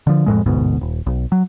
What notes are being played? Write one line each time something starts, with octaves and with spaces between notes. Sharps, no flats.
D3 F3
F2 A2 G#3
G1 D2 G#2 B2
D#1
B1
F#3